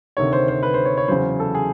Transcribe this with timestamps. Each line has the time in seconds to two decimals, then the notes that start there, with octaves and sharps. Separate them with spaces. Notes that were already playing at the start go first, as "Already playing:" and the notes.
0.17 D2 C3 D#3 C#5
0.33 C5
0.48 C5
0.63 B4
0.74 C5
0.85 C#5
0.97 C#5
1.08 E2 C#3 F#3 C5
1.40 A4
1.54 G#4